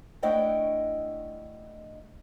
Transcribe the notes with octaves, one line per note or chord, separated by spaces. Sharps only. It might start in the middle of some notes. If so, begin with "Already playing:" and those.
A3 D4 E4 D#5 F#5 G5